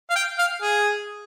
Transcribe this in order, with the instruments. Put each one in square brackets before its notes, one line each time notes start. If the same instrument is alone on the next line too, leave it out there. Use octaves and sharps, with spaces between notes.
[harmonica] F5
G5
F5
G#4